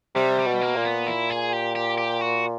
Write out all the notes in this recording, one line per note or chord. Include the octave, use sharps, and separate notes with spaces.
C3 G3
G3
B2
A#3
A#2
B3
E4
G#4
G4
G4
G4
F#4